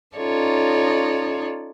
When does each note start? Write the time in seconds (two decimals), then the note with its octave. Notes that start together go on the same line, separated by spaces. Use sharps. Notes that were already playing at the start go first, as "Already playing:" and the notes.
0.17 C#4 D#4 F4 A4 C#5 D5